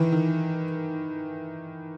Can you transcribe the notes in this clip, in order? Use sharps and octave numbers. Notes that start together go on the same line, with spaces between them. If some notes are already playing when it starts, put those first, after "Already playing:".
Already playing: D#3 E3
D#3